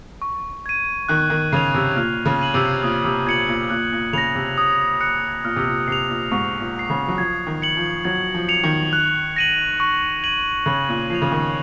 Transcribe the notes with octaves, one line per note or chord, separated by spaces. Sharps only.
C#6
G#6 D#7
D#3 F#6
D#3
C#3 C7 F7
C3
A#2 F6
C#3
G#6 D#7 F#7
C3
A#2 D#6
C3
A#2 G#6 C#7 F#7
A#2
A#2 F#6
A#2
C#3 A#6 F7
C3
D#6
F#6 C#7
A#2 F6
C3
A#2
C3 C7 F7
A#2
G#2 C#6
A#2
F6 C7
C#3
F#3
F3 G#6
D#3
C#7 F#7
F3
F#3 G#6
F3
C#7 F7
D#3
F#6
A#6 D#7 F#7
C#6
G#6 D#7 F#7
C#3 F#6
A#2
F3 C7 F7
C#3
D#3